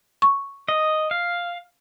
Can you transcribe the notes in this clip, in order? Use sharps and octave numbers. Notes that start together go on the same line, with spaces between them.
C#6
D#5
F5